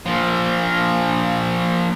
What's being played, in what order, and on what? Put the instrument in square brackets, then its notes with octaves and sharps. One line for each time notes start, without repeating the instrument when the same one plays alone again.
[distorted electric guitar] A#2 F3